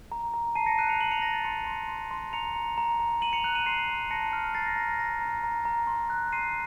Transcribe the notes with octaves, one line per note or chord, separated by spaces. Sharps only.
A#5
A#5
A5 C7 D#7
A#6 C#7
F#6 C7 D#7
C#7 F7
A#5 D#7 F#7
C#7 F7
A#5 A#6
A6
C6 A#6 C#7
C6
C6
C6
A#5 C#7 F7
A#5
A#5
A#5
A#5 D#7 F#7
C#7 F7
F#6 C#7 F7
D#7 F#7
C6 C7 D#7
C6
A5 A#6 C#7
F6
A#5 A6 C7
A#6
A#5 A#6
A#6
A#5 A#6
A#5
A#5
A#5
C6
F#6
C6 C7 D#7